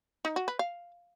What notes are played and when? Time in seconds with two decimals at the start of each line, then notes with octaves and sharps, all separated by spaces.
0.25 D#4
0.36 F#4
0.48 B4
0.59 F5